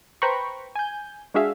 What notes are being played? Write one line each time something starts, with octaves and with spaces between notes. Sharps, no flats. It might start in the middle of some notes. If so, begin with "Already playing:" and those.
B4 C5 G5 A#5 B5 C#6
G#5 G6
G#3 D4 F#4 G#4 E5 F5